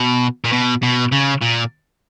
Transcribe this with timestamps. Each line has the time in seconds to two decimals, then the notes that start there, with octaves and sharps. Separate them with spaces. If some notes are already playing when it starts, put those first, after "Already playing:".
Already playing: B2
0.45 A#2
0.52 B2
0.83 B2
1.12 C#3
1.42 A#2